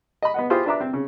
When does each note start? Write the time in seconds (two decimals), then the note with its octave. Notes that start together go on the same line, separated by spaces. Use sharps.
0.22 D#5 B5
0.34 B3 D#5 F#5
0.50 E4 F4 G4 G#4 C5
0.66 D4 B4 E5 A#5 D6
0.81 C4
0.93 C#3